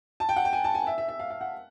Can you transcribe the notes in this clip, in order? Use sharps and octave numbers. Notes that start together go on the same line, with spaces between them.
A5
G5
F#5
G5
G#5
A5
G#5
E5
E5
E5
F5
F5
F#5